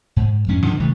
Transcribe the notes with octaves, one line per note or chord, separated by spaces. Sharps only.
G#2
F2 G#2 C#4
G2 D3 E3 F3
C3 D#3 G#3 A3